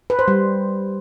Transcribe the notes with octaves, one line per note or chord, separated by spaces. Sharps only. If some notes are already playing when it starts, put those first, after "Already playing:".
B4
C5
G3